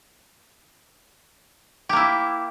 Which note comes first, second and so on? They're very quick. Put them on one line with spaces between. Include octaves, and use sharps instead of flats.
G4 A#3 E4